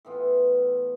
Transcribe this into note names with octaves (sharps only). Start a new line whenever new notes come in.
A2 E3 B3 F4